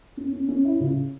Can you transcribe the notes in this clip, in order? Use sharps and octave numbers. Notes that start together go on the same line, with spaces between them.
C#4
C#4
C#4
E4
C#3